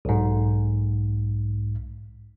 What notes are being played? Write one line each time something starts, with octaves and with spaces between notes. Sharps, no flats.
B1 G#2